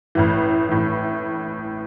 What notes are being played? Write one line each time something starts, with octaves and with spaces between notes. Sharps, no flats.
A1 A2 E3
A1 A2 E3